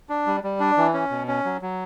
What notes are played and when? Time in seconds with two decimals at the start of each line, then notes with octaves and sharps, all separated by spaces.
0.09 D4
0.27 G3
0.44 G3
0.60 D4
0.77 E3
0.94 C#4
1.11 B2
1.28 C#4
1.45 F#3
1.62 F#3